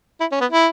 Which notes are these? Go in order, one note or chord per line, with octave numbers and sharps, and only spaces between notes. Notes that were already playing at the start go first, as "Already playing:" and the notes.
E4
C#4
B3
E4